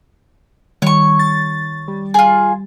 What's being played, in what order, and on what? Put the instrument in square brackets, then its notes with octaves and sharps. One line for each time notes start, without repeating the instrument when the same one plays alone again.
[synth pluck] D#3 G3 [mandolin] C#5 C#6
[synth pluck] A6
G3
[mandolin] F4 G#4